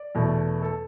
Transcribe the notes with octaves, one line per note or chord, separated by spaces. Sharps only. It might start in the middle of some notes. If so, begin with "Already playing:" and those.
Already playing: D5
E2 B2 A3
A4